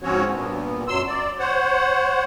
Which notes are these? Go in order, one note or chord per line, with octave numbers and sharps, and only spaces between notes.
G#2 F3 C4 C#4 F#4 C#5
G2 A#2 B3
F#2 F#3 C6 E6
D5
C5 C#5 F#5